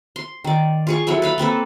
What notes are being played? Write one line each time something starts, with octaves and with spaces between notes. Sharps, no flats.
C6
D#3 D5
F4 G#4 C#6
F#3 B3 E4 A4
B4 F5 B5
A#3 C4 A4 B4